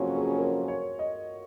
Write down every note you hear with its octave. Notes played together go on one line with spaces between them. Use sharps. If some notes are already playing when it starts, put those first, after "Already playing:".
Already playing: F2 C#3 F#3 A#3 C#4 F4 F#4
G#4
A#4
C#5
D#5